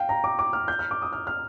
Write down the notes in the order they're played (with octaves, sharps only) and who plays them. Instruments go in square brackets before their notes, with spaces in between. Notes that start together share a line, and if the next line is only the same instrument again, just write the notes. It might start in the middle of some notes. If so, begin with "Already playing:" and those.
Already playing: [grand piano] F5 G5
A#5
D6
D6
F6
G6
F6
D6
D#6
F6
F6